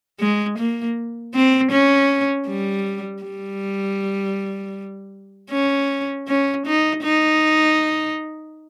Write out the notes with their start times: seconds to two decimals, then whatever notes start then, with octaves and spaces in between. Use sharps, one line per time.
0.20 G#3
0.58 A#3
1.35 C4
1.71 C#4
2.48 G3
3.23 G3
5.52 C#4
6.28 C#4
6.67 D#4
7.03 D#4